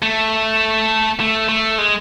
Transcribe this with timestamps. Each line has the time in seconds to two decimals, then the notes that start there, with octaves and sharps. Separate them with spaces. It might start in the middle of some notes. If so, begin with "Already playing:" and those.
0.02 A3
1.20 A3
1.49 A3
1.78 G#3